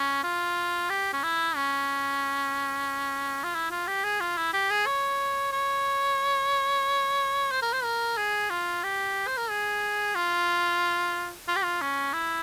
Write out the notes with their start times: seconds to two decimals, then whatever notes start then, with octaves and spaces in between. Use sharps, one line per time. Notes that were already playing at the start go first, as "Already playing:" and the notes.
Already playing: C#4
0.24 F4
0.90 G4
1.13 C#4
1.23 E4
1.56 C#4
3.44 F4
3.54 E4
3.71 F4
3.87 G4
4.04 G#4
4.21 F4
4.37 E4
4.54 G4
4.71 G#4
4.87 C#5
5.52 C#5
7.52 C5
7.62 A#4
7.73 C5
7.84 A#4
8.18 G#4
8.50 F4
8.84 G4
9.27 C5
9.38 A#4
9.50 G#4
10.15 F4
11.48 F4
11.56 G4
11.64 F4
11.81 C#4
12.13 E4